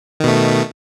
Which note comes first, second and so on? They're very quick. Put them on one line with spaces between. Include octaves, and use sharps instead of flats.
D#3 B2 A3